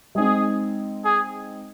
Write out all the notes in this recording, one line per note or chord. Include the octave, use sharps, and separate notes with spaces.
G#3 C4 D#4 G#4
G#4